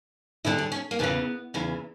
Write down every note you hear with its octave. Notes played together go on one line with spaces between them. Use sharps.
D2 D3 G3 E4
D4
C#4
A#3
E2 C#3 E3 B3
E2 C#3 E3